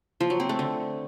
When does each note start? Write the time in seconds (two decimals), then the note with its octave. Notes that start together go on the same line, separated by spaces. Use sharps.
0.20 F3
0.30 F#3
0.40 C4
0.49 A3
0.59 D3